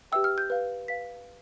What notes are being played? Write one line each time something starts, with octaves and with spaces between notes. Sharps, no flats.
G4 B4 E5 G5 E6
F6
G6
B4 F5
B4 F5 B6